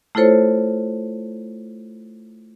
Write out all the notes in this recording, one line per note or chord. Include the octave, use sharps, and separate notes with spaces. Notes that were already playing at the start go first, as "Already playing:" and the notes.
A3 E4 F4 A4 C5 C#5